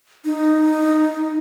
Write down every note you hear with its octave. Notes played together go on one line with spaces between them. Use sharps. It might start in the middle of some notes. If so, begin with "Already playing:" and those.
D#4